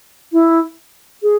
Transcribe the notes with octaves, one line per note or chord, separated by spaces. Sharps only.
E4
G#4